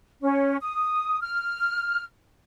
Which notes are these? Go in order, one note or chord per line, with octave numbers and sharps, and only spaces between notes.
C#4
D#6
F6